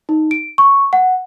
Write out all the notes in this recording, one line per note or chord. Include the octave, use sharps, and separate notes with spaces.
D#4
D7
C#6
F#5